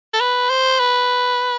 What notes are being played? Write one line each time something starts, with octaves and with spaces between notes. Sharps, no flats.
A4
B4
C5
B4